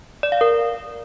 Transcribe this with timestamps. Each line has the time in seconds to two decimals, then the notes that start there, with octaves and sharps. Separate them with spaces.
0.23 D5
0.32 F5
0.41 A#4